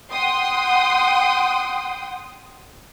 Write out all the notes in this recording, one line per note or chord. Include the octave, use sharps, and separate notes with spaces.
F#5 G5 C6 D#6